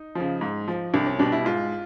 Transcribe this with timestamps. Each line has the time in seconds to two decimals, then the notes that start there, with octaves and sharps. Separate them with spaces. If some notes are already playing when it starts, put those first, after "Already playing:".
Already playing: D#4
0.15 C#3 F3
0.41 G#2
0.68 F3
0.94 C2 D4
1.06 C#4
1.19 B2 G3 D4
1.32 E4
1.45 G#2 F4